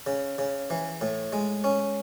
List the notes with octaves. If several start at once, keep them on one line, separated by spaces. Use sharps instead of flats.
C#3
C#3
E3
A2
G#3
C#4